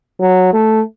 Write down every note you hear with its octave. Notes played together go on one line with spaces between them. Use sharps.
F#3
A3